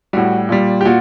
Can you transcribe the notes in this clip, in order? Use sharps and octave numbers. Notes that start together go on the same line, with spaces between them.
A2 G3 F#4
A#2 G3
G4
A#2 F#4